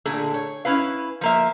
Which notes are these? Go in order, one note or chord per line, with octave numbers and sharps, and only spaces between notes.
A#2 D3 A3 G#4
C#5
C#4 E4 B4 F5
F3 A#3 E5